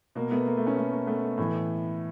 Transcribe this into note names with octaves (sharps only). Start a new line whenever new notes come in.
B2 A#3
A3 B3
A#3
A3
B3 C#4
A3
A#3
A3 B3
A2 E3